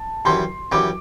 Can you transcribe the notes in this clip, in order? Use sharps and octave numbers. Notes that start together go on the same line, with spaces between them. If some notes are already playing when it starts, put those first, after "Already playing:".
Already playing: A5
F#2 E3 G3 C6
F#2 E3 G3 D6